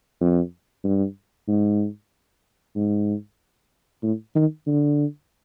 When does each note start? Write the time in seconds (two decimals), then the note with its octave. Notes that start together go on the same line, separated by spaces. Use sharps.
0.21 F2
0.85 G2
1.48 G#2
2.76 G#2
4.03 A2
4.35 D#3
4.67 D3